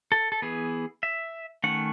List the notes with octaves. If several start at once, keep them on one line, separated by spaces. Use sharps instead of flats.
A4
A4
E3 B3 G#4
E5
D#3 A3 C#4 F#5